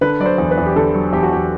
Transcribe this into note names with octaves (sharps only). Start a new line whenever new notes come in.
D3 B4
F#3 D5
C5
E2
B4
E2
G4
D3 A4
F#3
E2 G4
F#4
E2 G4